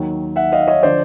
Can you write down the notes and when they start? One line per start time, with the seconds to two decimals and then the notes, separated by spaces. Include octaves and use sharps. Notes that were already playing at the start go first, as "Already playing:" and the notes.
Already playing: D#2 D#3 F#3
0.36 E5 F#5
0.52 D#5 F5
0.61 E5
0.68 C#5 D#5
0.83 D3 F3 C5 D5